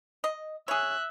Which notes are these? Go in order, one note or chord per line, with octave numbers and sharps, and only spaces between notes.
D#5
G#4 C#5 E5 F#6